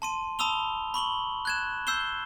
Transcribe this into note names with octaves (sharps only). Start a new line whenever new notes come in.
A5 C6 D#7
A5 B5 D#6 E6 F7 G7
B5 C#6 F#7 G7
F#6 G#6 E7
E6 G6 C7 E7 G7